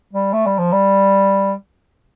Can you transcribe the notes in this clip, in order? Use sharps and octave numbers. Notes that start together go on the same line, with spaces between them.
G3
A3
G3
F3
G3